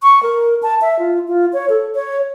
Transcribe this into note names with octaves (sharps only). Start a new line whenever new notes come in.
C#6
A#4
A5
E5
F4
F4
C#5
A4
C#5